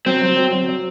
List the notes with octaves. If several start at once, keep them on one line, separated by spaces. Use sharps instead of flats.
F#3 C4
F#3
F#3
F#3
F#3